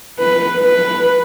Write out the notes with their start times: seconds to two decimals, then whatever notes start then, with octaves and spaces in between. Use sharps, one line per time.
0.19 B4
0.60 B4